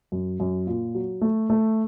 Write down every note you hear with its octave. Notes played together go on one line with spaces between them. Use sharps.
F#2
F#2
A#2
F#3
A3
A3